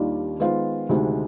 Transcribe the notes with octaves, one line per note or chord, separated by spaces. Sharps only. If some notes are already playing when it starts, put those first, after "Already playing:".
Already playing: D#2 D#3 G3 D4 F4
D#3 G#3 B3 F4 C5
D2 C3 D#3 G#3